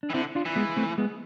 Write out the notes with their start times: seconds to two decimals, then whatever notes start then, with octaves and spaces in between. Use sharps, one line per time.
0.03 D4
0.10 E3
0.14 D3 C4 E4
0.35 D4 F4
0.45 E3
0.56 G#3 B3
0.76 A3 C4
0.98 G#3 B3